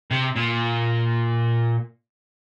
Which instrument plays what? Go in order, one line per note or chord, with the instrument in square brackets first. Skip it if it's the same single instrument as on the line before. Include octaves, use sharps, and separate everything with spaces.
[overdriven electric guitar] C3
A#2